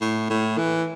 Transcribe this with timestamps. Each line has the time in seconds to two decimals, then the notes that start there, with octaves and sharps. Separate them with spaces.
0.01 A2
0.30 A2
0.58 E3